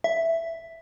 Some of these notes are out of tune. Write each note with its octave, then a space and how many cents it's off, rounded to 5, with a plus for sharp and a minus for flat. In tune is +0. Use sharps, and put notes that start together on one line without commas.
E5 +5